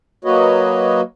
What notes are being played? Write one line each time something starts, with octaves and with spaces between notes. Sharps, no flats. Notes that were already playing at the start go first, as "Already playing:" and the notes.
F#3 A#3 F#4 B4 C#5 D#5